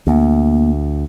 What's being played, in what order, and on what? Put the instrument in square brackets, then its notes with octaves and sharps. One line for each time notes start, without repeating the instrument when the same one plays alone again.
[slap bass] D2 [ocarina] A#3